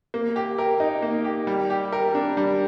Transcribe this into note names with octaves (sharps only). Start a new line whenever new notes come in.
A#3
G4
A#4
D#4
A#3
G4
G3
G4
A#4
D4
G3